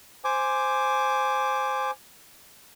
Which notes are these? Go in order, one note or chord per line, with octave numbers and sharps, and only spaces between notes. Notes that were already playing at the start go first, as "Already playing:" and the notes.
C5 G#5 D6